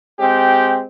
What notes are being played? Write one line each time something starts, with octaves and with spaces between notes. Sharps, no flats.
G#3 C4 G4